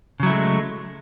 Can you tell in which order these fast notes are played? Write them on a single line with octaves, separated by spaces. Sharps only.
C#3 F#3 E4 A3 G#3